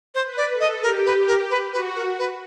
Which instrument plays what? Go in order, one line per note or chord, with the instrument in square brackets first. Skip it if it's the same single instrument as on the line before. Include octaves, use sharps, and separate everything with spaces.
[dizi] C5
[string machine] B4
[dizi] D5
[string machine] A4
[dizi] D#5
[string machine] G4 [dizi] A#4
[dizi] B4
A#4
B4
[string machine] F#4 [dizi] B4
[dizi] A#4
B4